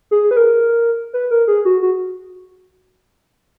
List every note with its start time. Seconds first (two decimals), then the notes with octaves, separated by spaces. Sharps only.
0.11 G#4
0.31 B4
0.37 A#4
1.13 B4
1.31 A#4
1.48 G#4
1.65 F#4
1.82 F#4